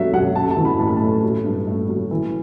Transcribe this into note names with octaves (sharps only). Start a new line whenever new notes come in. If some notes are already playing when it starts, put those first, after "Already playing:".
Already playing: F#3 A3 E5
F#3 F#5
A3 A5
A5
E3
B5
A2 A5
B5
A3 A5
F#3
G2
A3
F#3
E3